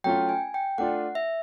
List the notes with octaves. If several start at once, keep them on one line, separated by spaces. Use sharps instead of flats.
F#3 A3 C#4 F4 G5
G#5
G5
A3 D4 F4 F#5
E5